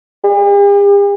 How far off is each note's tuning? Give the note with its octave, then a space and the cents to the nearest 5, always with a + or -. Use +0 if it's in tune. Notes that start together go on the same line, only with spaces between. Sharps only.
G4 +45